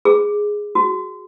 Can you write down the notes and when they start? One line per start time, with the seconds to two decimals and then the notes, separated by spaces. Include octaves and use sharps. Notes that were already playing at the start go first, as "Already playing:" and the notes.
0.05 G#4
0.75 F#4